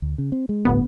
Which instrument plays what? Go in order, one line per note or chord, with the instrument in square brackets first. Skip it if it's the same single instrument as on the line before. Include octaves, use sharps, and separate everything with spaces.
[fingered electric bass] D2
C#3
C4
G#3
[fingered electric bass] D1 A2 [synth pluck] G1 B3